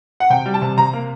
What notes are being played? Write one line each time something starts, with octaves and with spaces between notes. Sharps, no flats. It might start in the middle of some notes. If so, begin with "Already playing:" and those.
F#5
C3 G5
G3
A5
C3
C3 A#5
A#3